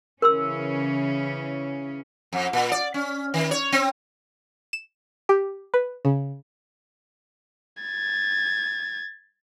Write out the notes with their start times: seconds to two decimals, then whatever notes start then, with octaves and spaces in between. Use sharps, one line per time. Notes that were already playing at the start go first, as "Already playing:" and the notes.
0.22 C#3 E3 C#4 A#4 C6 E6
2.33 F2
2.53 A#2
2.72 D5
2.94 C#4
3.34 D#3
3.51 C#5
3.72 C4
4.73 E7
5.29 G4
5.74 B4
6.05 C#3
7.83 G#6 A6